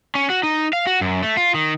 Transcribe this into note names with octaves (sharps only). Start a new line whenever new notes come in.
C#4
F#4
D#4
F5
F#4
F#2
A3
F4
D#3